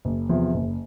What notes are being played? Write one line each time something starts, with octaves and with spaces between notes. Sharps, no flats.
F#1
E2 C3 F3
F#1